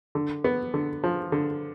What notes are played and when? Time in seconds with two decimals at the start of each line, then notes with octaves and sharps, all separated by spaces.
0.15 D3
0.44 B3
0.74 D3
1.04 F3
1.32 D3